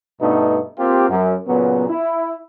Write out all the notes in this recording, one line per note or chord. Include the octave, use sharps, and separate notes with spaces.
G2 B2 A3 B3 D4 D#4
A#3 C4 F4 G4
F#2
A#2 C#3 F#3 B3
E4